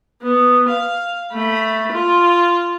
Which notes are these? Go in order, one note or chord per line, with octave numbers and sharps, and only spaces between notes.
B3
F5
A3 B5
F4